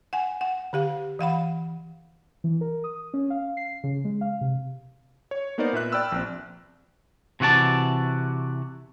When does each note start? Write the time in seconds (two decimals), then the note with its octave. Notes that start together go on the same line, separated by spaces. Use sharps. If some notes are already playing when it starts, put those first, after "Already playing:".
0.13 F#5 G#5
0.41 F#5
0.73 D3 G4 F5
1.19 E3 F5 F#5 B5
2.44 E3
2.61 A#4
2.84 D#6
3.14 C#4
3.30 F5
3.57 C7
3.84 C#3
4.05 G#3
4.21 F5
4.41 C3
5.31 C#5
5.58 A#3 B3 D#4 A#4 C5 D5
5.73 A#2 B4 E5 F#6
5.92 D5 G5 B5 E6 F6
6.12 A#1 C4
7.40 C3 E3 F#4 D5 A5